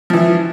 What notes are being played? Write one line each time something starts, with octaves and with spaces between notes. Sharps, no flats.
E3 F3 E4